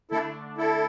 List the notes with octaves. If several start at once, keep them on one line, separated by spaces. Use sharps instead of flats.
D3 A3 D4 E4 A4
E4 A4